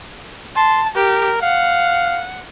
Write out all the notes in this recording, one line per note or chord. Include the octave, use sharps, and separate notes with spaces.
A5 C6
G4 A#4
F5 F#5